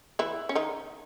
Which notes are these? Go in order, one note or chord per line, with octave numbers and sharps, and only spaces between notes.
E3 E4
C#4
D#3 D#4